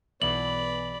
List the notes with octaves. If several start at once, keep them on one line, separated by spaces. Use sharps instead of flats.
B1 B2 E3 D5 B5 F#7